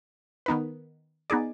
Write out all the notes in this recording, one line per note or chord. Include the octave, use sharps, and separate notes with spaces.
D#3 B3 D#4 B4
B3 D#4 G#4 D5